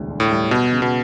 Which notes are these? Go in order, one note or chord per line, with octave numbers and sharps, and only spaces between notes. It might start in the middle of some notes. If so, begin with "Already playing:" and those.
Already playing: E1 D2 G3
D3
A2
G3
B2 B3
C#3
B2